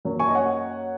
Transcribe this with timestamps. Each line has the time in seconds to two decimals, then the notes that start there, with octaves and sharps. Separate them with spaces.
0.05 F#2 F#3 A#3
0.19 G#5 C#6
0.28 D#5
0.35 C#5 F#5